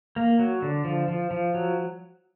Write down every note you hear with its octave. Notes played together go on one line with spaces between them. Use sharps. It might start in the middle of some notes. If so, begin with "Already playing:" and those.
A#3
F#3
D3
F3
F3
F3
F#3